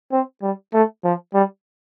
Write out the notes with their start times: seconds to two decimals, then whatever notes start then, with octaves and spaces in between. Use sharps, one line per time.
0.12 C4
0.42 G3
0.73 A3
1.04 F3
1.34 G3